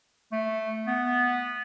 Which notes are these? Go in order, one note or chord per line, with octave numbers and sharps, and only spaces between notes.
A3
B3